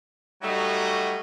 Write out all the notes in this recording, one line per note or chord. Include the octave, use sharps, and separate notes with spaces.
F#3 G3 A3 D#4 F#4